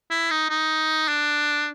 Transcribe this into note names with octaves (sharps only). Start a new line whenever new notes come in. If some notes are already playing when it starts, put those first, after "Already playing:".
E4
D#4
D#4
D4